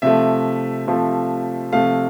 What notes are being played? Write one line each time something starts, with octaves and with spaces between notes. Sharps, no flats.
C3 F3 A3 E5
C3 F3 A3
C3 F3 A3 F5